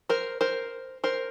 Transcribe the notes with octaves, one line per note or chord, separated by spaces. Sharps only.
A#4 C5
A#4 C5
A#4 C5